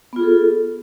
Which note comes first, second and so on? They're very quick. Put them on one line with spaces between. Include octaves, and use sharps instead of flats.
B3 F4 G#4 A4